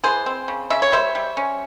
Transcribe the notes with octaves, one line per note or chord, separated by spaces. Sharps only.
E3 G#4 C5
C4
C#3
C#3 E5
C#5
G3 C5 E5
G3
C#4